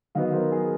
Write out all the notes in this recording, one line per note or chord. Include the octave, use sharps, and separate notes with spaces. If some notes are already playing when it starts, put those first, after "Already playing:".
D#3 F#3 B3 D#5 F5
A#4 C5
G#4